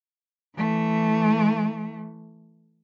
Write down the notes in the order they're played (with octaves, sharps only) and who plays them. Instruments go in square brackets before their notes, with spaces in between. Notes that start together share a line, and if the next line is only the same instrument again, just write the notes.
[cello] E3 A3